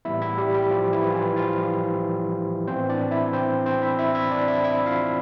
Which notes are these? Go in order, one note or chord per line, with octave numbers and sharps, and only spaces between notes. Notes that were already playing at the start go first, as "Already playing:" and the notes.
A2 E3 G3 B3 E4 E5
E4 E5
G3 G4
G3 G4
F3 F4
E3 E4
F4
E3 E4
F3 F4
A2 E3 B3 C4 C5
D4 D5
E4 E5
C4 C5
C4 C5
E4 E5
E4 E5
E4 E5
D4 D5
E4 E5
E4 E5
F4 F5